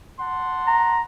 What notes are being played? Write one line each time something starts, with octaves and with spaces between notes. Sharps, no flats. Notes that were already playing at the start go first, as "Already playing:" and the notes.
F#5 A5 C6
A#5